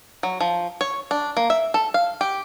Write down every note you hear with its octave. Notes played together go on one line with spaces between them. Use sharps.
F#3
F3
C#5
D4
A#3
E5
A4
F5
G4